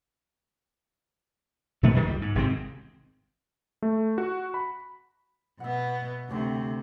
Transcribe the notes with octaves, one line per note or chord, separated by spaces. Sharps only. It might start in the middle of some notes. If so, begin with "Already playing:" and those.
B2 D#3 A3
G2 D#3 G3 B3
C#2 G3
G#2
G#1 C3 G#3 C4
A3
F#4
B5
B2 B3 E5 F#5
D2 C3 D4 C#5 G5